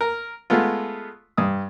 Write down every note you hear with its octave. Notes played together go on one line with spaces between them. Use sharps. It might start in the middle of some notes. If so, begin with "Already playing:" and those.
A#4
G#3 A3 B3 F4
G2 D#6